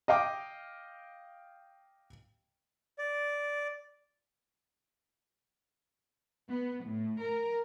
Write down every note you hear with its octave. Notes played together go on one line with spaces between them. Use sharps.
D#5 F5 G5 D6
D5
B3
A2
A#4